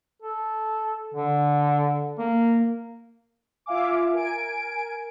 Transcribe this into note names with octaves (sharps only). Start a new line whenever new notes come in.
A4
D3
A#3
F4 E5 F5 G#5 D6
A#4 G#5 D7